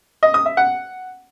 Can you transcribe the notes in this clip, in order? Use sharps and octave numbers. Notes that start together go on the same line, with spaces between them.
D#5
D#6
E5
F#5